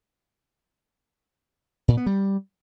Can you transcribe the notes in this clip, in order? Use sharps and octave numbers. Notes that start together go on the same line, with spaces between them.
A#2
B3
G3